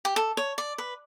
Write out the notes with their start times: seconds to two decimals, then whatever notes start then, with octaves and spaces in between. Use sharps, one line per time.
0.05 G4
0.16 A4
0.37 C#5
0.58 D5
0.78 B4